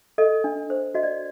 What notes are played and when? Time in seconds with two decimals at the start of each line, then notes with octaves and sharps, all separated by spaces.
0.18 A4 D#5
0.44 D4
0.70 C5
0.94 F#4 D#5
1.03 D5